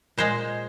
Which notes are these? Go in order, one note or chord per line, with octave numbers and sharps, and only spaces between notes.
A#2 G#3 C5